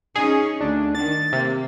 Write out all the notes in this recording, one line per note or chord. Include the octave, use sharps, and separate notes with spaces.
C#4 D#4 G#4
D2 D4
D#3 A6
C3 A#3